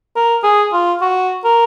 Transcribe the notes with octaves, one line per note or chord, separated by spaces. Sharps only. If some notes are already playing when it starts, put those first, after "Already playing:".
A#4
G#4
F4
F#4
A#4